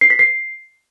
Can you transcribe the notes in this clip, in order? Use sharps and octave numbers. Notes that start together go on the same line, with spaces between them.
C7
B6
C7